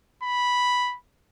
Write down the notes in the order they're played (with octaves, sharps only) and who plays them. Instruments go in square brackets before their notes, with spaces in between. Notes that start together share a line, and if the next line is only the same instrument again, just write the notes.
[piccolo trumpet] B5